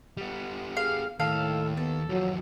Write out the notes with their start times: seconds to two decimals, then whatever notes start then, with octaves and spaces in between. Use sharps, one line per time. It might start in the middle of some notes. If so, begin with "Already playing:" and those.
0.17 G3 B3
0.77 G#4 F5
1.20 D#2 A2 A4 F5
1.77 B3 A4
2.09 D#2 F3 F#3